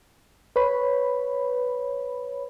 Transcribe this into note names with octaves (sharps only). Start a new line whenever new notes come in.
B4 C#5 B5